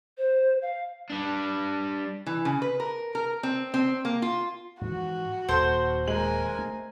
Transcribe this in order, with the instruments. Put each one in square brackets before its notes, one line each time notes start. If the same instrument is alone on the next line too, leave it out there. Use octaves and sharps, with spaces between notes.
[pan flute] C5
F5
[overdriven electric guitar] G3 D4
[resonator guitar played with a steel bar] E3
C#3
B4
A#4
A#4
C4
C4
A#3
F4
[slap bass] G#2 E3 F3 [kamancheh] F#4
[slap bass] D#1 [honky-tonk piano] A4 [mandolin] C5
[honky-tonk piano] G#3 F#7 [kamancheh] A#4 G#5
[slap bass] A3